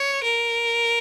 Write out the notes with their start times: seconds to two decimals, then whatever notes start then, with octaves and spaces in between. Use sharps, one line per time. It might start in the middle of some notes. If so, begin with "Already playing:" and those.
Already playing: C#5
0.23 A#4